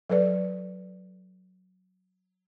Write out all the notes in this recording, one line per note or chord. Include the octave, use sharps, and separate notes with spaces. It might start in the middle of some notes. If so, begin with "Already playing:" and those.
F#3 A4 B4 D5